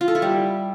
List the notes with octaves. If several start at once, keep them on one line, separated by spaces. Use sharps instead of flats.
F4
A4
E4
G3